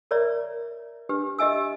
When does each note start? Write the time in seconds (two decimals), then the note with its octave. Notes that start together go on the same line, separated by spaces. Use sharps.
0.11 A#4 C#5 D5 E5 A#5
1.09 D4 G4 B4
1.39 G4 D#5 E5 G#5 E6